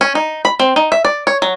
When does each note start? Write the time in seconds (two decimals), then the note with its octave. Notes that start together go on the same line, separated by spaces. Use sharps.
0.01 C#4
0.15 D#4
0.45 B5
0.60 C4
0.76 D#4
0.92 E5
1.05 D5
1.27 C#5
1.42 F#3